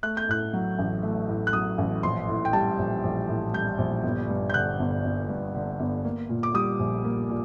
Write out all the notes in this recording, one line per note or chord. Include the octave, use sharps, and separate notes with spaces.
A3 F#6
G6
A2 F#6
F#3
A1
A3
A2
F#6
F#3 D#6
A1
A#1 C6
A2
G5
G3 A5
A#1
A#1
A2
G3 G6
A#1
G1
G2
G6
D3 F#6
G1
G1
G2
D3
G1
A#3
A#2
D6
G3 D#6
A#1
A#3
A#2